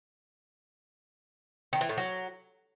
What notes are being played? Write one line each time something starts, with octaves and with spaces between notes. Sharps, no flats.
D#3
E3
A2
F#3